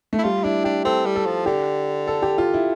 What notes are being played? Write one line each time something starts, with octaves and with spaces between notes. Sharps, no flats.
A3
E4
G3 F4
D4 E4
D4 G4
C4 A4
G3
A4
F3
D3 G4
A4
G4
F4
E4